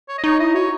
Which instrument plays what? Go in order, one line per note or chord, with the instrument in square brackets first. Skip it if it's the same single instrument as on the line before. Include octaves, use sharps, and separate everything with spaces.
[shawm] C#5
D#5
[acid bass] D#4 [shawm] C#5
[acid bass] E4 [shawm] D#5
[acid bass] F#4 [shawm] C#5